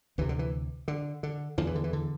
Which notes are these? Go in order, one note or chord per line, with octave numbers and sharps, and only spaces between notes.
D2 C3 E3
D3
E3
D3
D3
E2 D3 F3
E3
D3
E3
D3